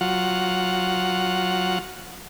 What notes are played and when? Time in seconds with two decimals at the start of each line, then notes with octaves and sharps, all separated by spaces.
0.01 F#3 F4 F#5